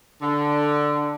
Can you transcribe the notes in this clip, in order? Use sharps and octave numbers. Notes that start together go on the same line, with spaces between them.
D3